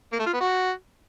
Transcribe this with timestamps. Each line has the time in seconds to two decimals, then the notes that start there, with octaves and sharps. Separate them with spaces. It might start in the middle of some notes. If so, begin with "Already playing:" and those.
0.12 A#3
0.19 A3
0.26 F4
0.33 B3
0.41 F#4